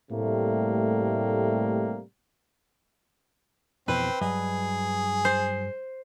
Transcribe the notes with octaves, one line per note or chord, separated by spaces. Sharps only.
A2 C3 G3 A3 A#3
F2 B2 E3 C4 B4
G2 F#3 G#4 D#5
C5